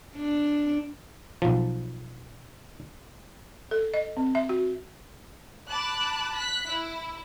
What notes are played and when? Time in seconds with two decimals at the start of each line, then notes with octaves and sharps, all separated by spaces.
0.16 D4
1.42 B1 F3
3.71 A4
3.94 D#5
4.17 C4
4.35 E5
4.49 F#4
5.69 A5 B5 D6 F#6
6.38 F#6 B6
6.68 E4